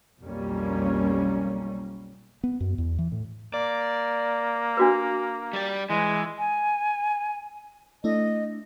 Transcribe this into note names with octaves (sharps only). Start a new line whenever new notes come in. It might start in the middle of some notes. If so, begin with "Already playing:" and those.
B1 F2 G3 A#3 C#4
B3
F#2
E2
E3
A2
A#3 D5
D4 F#4 B4
G3 D5
E3 G#3
G#5
A3 D4 E4 D#5